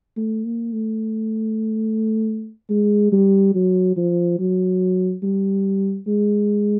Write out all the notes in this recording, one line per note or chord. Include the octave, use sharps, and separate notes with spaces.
A3
A#3
A3
G#3
G3
F#3
F3
F#3
G3
G#3